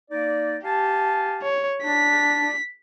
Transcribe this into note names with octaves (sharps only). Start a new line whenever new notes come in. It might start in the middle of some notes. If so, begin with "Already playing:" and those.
A#3 D#4 D5
G4 F5 G#5 A5
C#5
D4 B6